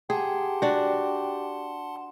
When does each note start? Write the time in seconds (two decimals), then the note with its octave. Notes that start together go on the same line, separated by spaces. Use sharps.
0.10 G4 G#4 F#5 A5 C6
0.62 D4 F#4